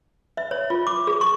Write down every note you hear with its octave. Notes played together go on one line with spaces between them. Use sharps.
E5
C#5
F4
D6
G#4
C#6